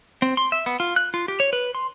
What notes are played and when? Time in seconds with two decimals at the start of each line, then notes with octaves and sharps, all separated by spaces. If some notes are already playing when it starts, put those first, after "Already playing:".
0.22 C4
0.37 C6
0.52 E5
0.66 B3
0.80 F4
0.96 F#6
1.14 F4
1.28 G4
1.40 C#5
1.53 B4
1.75 C6